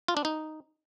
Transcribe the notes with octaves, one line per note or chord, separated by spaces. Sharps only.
F4
D4
D#4